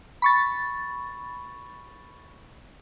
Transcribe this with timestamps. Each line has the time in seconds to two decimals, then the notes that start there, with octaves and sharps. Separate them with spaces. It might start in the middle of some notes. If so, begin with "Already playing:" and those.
0.22 B5 C#6 A6